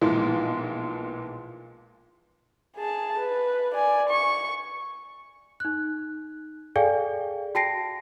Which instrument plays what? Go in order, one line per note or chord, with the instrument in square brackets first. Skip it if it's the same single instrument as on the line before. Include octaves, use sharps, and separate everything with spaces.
[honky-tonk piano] B1 A#2 E3 F3 G#3
[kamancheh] G#4 A5
B4
D5 G#5
C#6
[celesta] D#4 F#6
G#4 A4 D5 F5 G5 G#5
F#4 G5 A5 A#6 C7 D7